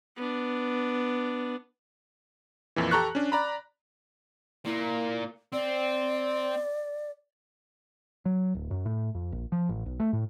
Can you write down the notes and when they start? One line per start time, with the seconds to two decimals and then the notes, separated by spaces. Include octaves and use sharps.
0.16 B3 D4
2.76 F2 A#2 E3
2.91 G4 A4 A#5 C#6 F#6
3.15 C#4 D4
3.32 D5 A#5 B5
4.65 A#2 A#3 E4
5.53 C4 D5
8.25 F#3
8.55 D1
8.71 F#2
8.86 A2
9.15 F2
9.32 A#1
9.52 F3
9.69 A1
9.86 B1
10.00 A3
10.13 A2